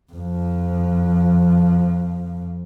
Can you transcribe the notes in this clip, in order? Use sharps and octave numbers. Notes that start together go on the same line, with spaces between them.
F2 F3